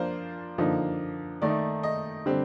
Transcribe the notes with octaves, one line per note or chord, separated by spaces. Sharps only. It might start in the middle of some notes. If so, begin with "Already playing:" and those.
Already playing: F3 A#3 D4 F4 C5
D3 F3 A#3 D#4
D#3 A3 D#4 D5
D#5
D3 G3 C4